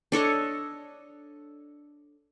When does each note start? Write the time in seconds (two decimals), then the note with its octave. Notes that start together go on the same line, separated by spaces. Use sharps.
0.12 D4 A4 C#5 D#5